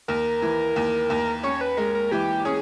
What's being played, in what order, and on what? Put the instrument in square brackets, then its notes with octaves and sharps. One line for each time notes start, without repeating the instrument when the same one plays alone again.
[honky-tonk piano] D#2 [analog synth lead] A#4
[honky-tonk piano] E3
D#2
D#2
[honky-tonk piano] C#4 [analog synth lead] C#5
[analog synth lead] B4
[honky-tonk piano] G#3 [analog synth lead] A#4
[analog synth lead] A#4
[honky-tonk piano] E3 [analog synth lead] G4
[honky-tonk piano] C#4 [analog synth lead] G#4